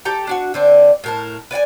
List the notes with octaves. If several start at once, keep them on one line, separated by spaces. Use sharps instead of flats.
G4 A4 A#5
D4 F#4 F#5
D3 C4 D4
A2 A#4 A5
B4 D5 F#5 G#5